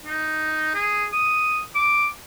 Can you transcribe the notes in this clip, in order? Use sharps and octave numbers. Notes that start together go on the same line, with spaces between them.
D#4
G#4
D#6
D6